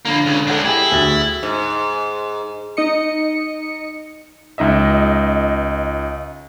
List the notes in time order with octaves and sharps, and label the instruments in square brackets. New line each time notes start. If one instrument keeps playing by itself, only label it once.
[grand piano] D3 A#5 B5 [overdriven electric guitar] F3 A#3
[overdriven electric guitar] C#2 C#3
[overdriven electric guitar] G#3 D4 [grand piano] A4 F#5 G6
[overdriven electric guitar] E4 [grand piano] G4 G#4
[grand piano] D2 F#4 A6
[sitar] G#2
[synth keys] D#4 D#5 C#7
[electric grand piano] C#2 D#4 D#5 E5